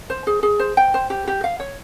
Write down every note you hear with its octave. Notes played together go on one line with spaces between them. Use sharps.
C5
G#4
G#4
C5
G5
C5
G4
G4
F5
C#5